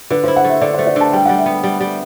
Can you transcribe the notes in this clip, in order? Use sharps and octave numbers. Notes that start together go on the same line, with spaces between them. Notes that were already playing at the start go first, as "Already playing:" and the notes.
D3 B4
C5
E4
F#5
A3 E5
D3 D5
A3 C5
D5
D3 A5
G3 G5
G3 F#5
E5
B3
G3
G3